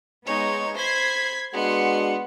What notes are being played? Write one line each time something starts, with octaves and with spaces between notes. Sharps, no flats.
G#3 B3 D#4 C#5
C5 B5 G#6 B6 C7
G#3 B3 D4 F#4 F#5 C6 C#7